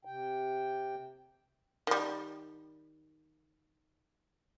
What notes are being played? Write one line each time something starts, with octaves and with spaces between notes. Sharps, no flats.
C3 G5
D#3 G3